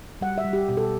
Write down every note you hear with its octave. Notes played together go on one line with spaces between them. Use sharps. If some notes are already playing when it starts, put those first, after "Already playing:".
G3 F#5
E5
G3
G4
B2 G4
A4